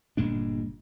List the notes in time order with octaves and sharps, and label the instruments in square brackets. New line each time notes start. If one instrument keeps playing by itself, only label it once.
[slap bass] G1 A#2 G#3 D4